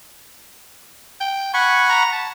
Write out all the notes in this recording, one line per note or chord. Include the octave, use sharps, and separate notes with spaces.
G5
F#5 G#5 B5 C#6
A#5
A5